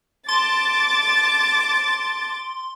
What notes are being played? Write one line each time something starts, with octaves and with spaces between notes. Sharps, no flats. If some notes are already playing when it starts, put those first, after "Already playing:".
A5 C6 D6 A6